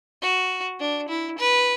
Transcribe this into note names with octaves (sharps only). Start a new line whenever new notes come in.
F#4
D4
E4
B4